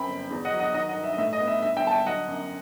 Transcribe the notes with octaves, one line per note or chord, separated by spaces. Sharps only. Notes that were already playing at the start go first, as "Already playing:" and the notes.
Already playing: F#2 C4 G5 B5
G1
E2
D#5 F#5
F#3
D#5 F#5
D#3 D#5 F#5
D#5 F#5
G2
E5
D#5
A2 E5
D#5
B3
E5
G2 E5
E5 G5
G1 A5
E5 G5
F#3 D#5 F#5
F#2